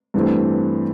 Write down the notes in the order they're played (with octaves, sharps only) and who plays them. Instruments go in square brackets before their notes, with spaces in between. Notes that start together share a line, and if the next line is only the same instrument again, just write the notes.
[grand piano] G2 E3 A3 C4